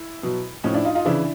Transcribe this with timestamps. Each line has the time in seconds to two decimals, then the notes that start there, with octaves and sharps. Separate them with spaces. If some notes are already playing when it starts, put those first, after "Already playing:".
Already playing: E4
0.23 B2 F#3
0.64 A2 F3 C#4 D#4
0.74 D4 E4
0.85 D#4 F4
0.95 D#4 F4
1.05 C#3 E3 D4 E4